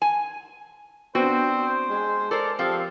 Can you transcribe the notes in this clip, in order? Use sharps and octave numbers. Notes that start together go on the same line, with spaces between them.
G#5
B3 C4 D4 F#4 C5
G#3
A4 A#4 C5 D5
F3 C4 G4 A4